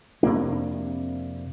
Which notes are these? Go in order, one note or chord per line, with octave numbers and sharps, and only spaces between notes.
F2 C3 A#3 D4